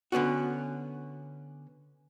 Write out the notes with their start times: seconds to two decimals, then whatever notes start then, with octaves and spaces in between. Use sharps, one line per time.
0.12 D3 B3 C#4 F#4